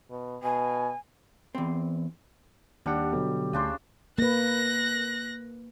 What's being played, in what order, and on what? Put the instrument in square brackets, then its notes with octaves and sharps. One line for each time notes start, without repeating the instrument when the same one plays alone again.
[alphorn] B2
[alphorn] B2 [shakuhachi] G#5
[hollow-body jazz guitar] E2 C4
[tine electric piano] D#2 D4 F#5 [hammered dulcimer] G3
[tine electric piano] B2 D3 F#3
[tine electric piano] D2 [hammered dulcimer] C#3 D4 C5
[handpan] A#3 B4 [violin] F#6 A#6